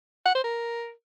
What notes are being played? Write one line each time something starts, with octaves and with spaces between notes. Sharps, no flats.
F#5
C5
A#4